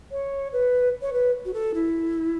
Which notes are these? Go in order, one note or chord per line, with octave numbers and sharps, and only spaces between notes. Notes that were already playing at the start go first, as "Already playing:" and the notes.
C#5
B4
C#5
B4
F#4
A4
E4